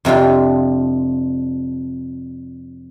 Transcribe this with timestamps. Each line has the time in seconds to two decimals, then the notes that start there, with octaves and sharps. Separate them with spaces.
0.05 F2 C3 D4 F4